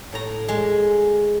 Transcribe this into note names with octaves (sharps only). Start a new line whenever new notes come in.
A2 A#5
G#3